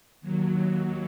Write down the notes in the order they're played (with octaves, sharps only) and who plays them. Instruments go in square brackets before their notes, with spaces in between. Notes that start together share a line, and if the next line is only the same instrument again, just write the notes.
[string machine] D#2 F#3